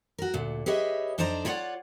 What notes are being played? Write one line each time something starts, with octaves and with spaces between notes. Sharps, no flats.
F#4 A#4
D2 A#2
G4 G#4 B4 C#5 D#5 E5
F2 D4 D#4 C5 D5 A#5
E4 F4 C#5 D5 F#5